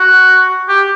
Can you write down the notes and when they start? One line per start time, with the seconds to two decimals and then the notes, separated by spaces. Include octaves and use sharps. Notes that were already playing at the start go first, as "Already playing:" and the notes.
Already playing: F#4
0.69 G4